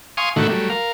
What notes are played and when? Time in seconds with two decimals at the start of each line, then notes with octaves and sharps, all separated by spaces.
0.17 F5 G#5 C6 C#6 D#6
0.36 A2 D3 D#3 A3 E4 F#4
0.50 F#3 G3 A3
0.70 A#4 F5